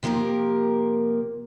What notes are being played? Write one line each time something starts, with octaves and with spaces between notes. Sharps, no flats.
C3 F3 A#3 G4 A#4